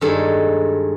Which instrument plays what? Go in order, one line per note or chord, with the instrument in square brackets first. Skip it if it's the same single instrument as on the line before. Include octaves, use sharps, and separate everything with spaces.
[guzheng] G2 D#3 G#3 A4